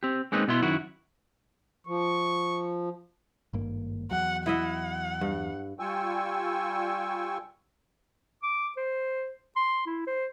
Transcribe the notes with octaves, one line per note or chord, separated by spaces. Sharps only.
C4 G4
G#3 A#3 C4 C#4 D#4 B4
B2 B3 E4 C6
F#2 D#3 E4 F#4
F3 C#6
G#1 G2 A#3
E2 F#3 F#5
E4 D#5 E5 F#5
G2
G3 F4 G5 G#5 C#6 E6
D6
C5
C6
E4
C5